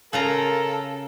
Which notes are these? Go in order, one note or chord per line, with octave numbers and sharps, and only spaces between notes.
C#3 C#4 F4 A4 A#4 A#5